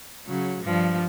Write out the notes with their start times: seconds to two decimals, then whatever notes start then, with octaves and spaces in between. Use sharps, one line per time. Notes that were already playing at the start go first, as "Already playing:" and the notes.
0.27 C#3 F#3
0.64 G2 F3